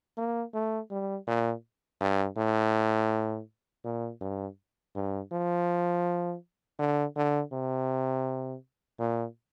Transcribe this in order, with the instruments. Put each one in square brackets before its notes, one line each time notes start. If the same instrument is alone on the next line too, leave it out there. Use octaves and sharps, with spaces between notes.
[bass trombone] A#3
A3
G3
A#2
G2
A2
A#2
G2
G2
F3
D3
D3
C3
A#2